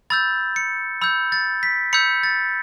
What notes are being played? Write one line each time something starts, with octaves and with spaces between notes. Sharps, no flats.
B5 E6 G6 A6
C#7
B5 E6 G6
A6
B6
B5 E6 G6 C#7
A6